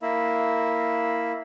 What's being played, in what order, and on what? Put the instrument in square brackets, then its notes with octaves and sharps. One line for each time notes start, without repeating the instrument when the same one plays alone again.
[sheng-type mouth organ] A#3 E4